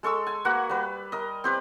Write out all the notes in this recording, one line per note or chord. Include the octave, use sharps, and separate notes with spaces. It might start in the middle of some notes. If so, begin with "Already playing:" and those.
G#3 A4 C#6 E6
G#5
A#3 F#4 B4 F#5
G3 B4
A#4 D#5
C4 G4 B4